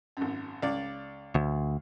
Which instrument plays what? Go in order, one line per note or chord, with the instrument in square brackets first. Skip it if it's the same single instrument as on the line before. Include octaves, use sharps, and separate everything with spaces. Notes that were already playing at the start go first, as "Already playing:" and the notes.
[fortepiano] G#1 F#2
C#2 D5
[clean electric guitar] D2